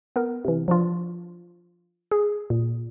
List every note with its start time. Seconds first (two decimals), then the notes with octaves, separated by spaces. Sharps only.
0.16 B3 A#4
0.45 C3 E3
0.68 F3 D4 F4
2.11 G#4
2.50 A#2